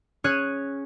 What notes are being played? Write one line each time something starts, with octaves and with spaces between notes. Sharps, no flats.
C#4 G#4 C#5 F#6 D#7